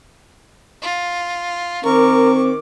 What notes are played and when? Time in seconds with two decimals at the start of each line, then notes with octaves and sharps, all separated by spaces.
0.82 F4
1.85 D#3 C4 A#4 C#6 D6